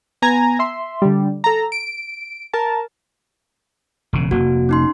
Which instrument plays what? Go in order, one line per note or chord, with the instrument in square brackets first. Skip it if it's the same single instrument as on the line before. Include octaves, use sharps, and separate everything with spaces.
[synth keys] B3 G#5 A#5 G#6
E5 C6
D3 G3
A4 A#5
D7
A#4 A5
[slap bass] E1 C#3
[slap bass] F1 A#3 [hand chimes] F#4
[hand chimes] C#4 D#4 C6